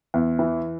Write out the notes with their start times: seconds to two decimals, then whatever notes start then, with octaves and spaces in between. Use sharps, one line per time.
0.14 E2
0.39 E3